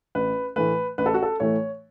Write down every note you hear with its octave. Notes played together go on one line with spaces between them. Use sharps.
A1 B4
A2 E3 A3 B4
A1 B4
A4
F#4
A4
A2 E3 A3 C#5